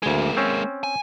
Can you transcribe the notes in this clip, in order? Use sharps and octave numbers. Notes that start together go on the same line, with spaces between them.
D2 G#3 A#3 G#5
C4 C#4
G#5